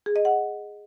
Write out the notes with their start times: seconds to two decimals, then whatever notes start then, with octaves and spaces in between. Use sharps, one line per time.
0.06 G#4
0.16 D#5
0.25 F#5